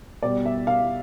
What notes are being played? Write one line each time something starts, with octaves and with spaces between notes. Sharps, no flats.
B2 G3 D5
E5
F5